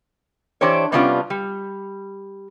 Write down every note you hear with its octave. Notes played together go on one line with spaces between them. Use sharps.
E3 D4 G4 C5 C#5
C3 G3 B3 C#4 D4 F4
G3